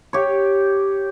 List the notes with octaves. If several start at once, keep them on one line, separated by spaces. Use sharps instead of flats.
G4 C#5